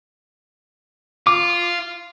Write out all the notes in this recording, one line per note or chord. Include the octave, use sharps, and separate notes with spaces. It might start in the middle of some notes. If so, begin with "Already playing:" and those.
F4 D6